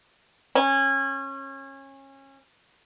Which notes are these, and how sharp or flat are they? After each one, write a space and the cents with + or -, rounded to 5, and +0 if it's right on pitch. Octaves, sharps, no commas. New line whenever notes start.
C#4 -25